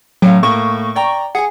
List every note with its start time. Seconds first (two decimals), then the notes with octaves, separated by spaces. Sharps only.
0.22 A2 F#3 C#4 F5
0.43 A2 A#3 C#6
0.96 D5 G5 A#5
1.35 G#4 F#5 G#5